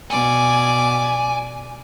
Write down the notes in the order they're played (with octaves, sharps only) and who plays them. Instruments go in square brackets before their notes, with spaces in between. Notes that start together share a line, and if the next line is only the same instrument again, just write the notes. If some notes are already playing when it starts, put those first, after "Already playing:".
[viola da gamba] B2 D5 [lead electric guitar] G#5